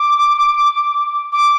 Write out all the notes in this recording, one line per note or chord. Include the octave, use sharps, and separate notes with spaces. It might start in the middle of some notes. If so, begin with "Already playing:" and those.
Already playing: D6
D6